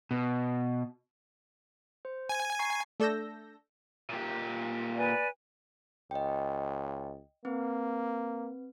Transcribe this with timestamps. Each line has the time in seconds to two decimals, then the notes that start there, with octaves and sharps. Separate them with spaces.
0.11 B2
2.05 C5
2.29 G#5
2.59 A#5 C#6 C7
3.00 A3 D4 A4 E6 G6 A#6
4.10 A#2 G4
4.96 B4 D5 G#5
6.11 C#2 D#5 G5
7.45 A#3 C4 B4